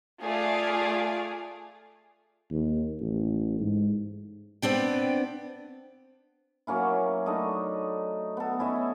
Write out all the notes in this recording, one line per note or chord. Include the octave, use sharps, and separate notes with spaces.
A3 F4 G#4 D5 F5
D#2
A1
G#2
B3 C4 D4 G5
F#3 A#3 C#4 E4
A3 D4 D#4 D#5
B3 A4
C#4 E4 D#5 E5